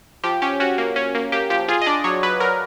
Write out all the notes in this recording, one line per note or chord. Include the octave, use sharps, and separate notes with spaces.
F3 G4
C#4 G4
C#4 F#4
A#3
C#4
A#3
A#3 G4
F3 G4
F4 G#4
D#5
D4 D5
F#3 C#5
F#3 B4
F#3 A#4